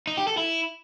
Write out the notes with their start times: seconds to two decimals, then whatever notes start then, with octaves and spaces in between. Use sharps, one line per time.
0.07 D#4
0.17 G4
0.27 A4
0.37 E4